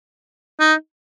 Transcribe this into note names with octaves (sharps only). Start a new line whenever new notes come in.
D#4